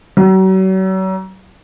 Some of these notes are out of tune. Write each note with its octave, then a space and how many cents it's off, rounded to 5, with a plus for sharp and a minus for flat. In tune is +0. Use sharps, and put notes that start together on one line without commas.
F#3 +40